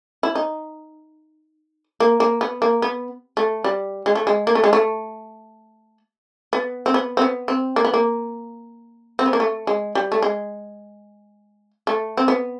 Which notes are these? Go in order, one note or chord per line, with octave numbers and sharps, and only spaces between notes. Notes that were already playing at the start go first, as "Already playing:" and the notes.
E4
D#4
A#3
A#3
B3
A#3
B3
A3
G3
G#3
A3
G#3
A#3
A3
G#3
A3
B3
C4
B3
C4
B3
C4
A#3
B3
A#3
C4
B3
A#3
A3
G#3
G3
A3
G#3
A3
C4
B3